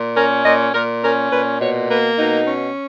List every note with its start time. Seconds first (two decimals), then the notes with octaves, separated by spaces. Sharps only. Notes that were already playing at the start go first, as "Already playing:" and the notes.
Already playing: A#2
0.16 C#4 A#4
0.45 A#2 D#5
0.74 A#2 A#4
1.03 C#4 A#4
1.31 A#2 B4
1.60 B2 C#5
1.89 A#3 B4
2.19 B2 D#4
2.47 C#4